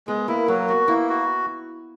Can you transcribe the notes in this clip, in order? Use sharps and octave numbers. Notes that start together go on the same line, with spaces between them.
G#3 B3
A#3 E4
F#3 A#3
B3 F#4
A#3 E4
F#4